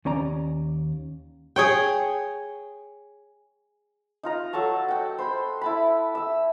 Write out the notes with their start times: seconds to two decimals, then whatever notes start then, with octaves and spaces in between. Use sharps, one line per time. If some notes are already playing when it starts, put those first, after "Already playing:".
0.05 D#2 C#4 D5 A#5
1.56 G#4 C#5 G5
4.23 D#4 F4 A#5
4.53 F#3 A4 A5 C#6
4.88 F#5 G5
5.19 C5 B5 C6
5.61 E4 A5 B5
6.15 E5 E6